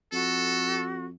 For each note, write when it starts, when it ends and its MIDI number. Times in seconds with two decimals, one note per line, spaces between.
0.12 1.12 41
0.12 1.05 66
0.12 0.85 69